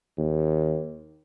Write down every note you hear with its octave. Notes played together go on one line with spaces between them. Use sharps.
D#2